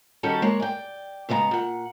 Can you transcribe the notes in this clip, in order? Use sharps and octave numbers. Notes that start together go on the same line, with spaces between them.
D#3 G3 C#4 F#4 G4 A4
G#3 A#3 C#5
D5 G5
C#3 G#3 B3 F#5 A#5
A#2 F#5